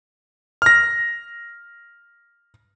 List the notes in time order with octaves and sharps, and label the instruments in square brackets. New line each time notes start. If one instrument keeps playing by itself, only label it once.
[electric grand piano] F6 A#6